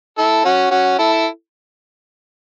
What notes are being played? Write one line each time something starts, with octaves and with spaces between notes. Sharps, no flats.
E4 A4
C#4 F#4
C#4 F#4
E4 A4